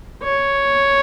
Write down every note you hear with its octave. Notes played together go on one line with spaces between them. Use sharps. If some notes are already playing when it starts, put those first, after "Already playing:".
C#5